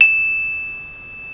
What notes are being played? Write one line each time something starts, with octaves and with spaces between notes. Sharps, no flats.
E7